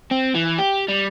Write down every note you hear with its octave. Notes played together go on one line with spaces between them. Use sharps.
C4
E3
G4
G3